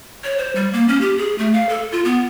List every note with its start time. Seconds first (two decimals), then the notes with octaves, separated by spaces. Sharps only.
0.24 C#5
0.38 C5
0.55 G3
0.73 A#3
0.88 C#4
1.01 G4
1.18 G#4
1.38 A3
1.53 F5
1.69 A4
1.92 F4
2.05 B3